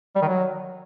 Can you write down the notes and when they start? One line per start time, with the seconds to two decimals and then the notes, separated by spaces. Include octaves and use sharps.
0.16 G3
0.22 D#3
0.28 F#3